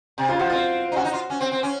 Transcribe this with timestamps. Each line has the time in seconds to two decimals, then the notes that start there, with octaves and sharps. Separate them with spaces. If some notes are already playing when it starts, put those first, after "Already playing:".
0.18 C3
0.28 C#3 F4
0.39 F3 F#4
0.50 C4 F4
0.92 D#4
0.96 C#4 F#4
1.04 D#4
1.13 F4
1.30 C#4
1.41 C4
1.52 C4
1.63 C#4